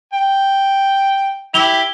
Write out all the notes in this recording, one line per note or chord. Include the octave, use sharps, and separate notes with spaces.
G5
E4 G4 F7 G7